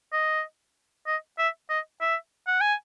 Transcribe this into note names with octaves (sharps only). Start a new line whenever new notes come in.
D#5
D#5
E5
D#5
E5
F#5
G#5